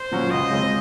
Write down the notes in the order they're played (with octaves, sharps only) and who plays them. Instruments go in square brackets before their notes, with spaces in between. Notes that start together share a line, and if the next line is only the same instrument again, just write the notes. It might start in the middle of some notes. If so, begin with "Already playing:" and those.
Already playing: [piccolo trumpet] C5
[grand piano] A#2 F#3 C#4 F#4
[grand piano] C#2 [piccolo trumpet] D#5
[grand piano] C#3 G#3 C4